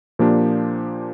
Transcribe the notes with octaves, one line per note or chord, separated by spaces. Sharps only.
A#2 F3 A#3 D4 G4